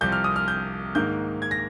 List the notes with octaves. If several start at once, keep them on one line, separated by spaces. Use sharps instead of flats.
C2 C3 F3 G6
F6
D#6
F6
G6
G#2 D#3 A#3 G6
G#6
A#6